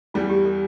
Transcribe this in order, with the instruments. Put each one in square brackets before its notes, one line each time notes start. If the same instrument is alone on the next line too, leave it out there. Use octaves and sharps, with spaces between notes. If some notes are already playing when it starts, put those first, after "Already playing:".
[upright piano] E2 E3 G3 [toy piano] F4
[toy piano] G4
A4